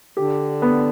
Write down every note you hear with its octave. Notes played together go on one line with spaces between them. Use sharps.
D3 G4
B3